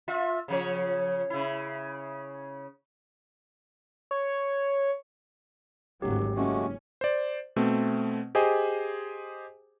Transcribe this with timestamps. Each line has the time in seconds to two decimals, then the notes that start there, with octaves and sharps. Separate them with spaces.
0.08 F4 E5
0.48 C#3 F3 C#5
1.30 C#3 E4
4.11 C#5
6.02 D1 G#1 F#3 G4
6.36 F#1 G#3 A3 C#4 F#4
7.01 C5 D5
7.56 B2 A3 C4
8.35 G4 G#4 C5 D#5 G#5